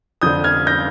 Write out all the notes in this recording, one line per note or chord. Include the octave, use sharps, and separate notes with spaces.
F2 D3 D#6 G6
F6 G#6
G6 A#6